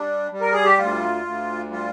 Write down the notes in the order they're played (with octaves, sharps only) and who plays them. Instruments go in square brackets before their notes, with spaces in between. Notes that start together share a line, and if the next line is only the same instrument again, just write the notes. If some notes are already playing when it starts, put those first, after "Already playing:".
Already playing: [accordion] G3 D4
G3
A#4
G#4
G4
D2 F4
D2
G3 F4